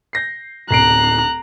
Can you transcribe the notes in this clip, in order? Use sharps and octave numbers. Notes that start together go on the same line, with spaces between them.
G6 A#6 C7
D1 A#5 F#6 C7 D7